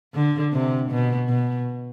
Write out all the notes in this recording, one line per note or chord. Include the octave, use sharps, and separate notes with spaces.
D3
C3
B2
B2